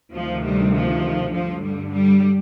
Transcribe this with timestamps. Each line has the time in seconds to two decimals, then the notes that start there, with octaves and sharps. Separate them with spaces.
0.13 D2 C3 D#3 F3
0.43 G3
0.73 F3
1.32 G2 D3 F3
1.62 G3
1.92 G3